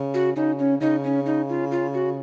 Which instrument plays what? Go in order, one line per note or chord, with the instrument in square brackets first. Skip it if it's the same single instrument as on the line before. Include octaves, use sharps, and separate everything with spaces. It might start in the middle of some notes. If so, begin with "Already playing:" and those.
Already playing: [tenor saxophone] C#3
[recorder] F#4
[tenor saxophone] C#3 [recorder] D#4
[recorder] C#4
[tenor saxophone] C#3 [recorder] D#4
[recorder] C#4
D#4
F4
F4
F#4